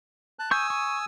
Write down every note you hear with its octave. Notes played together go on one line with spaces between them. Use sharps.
A5 F#6
G#5 C#6 D#6 E6 G6
C#6